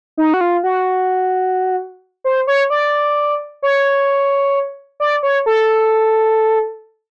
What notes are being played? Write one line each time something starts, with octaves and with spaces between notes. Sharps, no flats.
D#4
F#4
F4
F#4
C5
C#5
D5
C#5
D5
C#5
A4